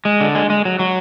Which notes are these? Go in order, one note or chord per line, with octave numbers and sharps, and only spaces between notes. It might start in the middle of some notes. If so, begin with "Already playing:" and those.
G#3
D3
G#3
G#3
F#3
F#3